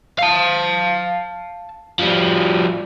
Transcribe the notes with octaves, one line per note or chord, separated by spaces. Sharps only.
F5 A5
F3 G3